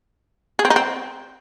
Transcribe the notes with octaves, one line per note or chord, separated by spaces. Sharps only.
G#4
C4
D#4
C4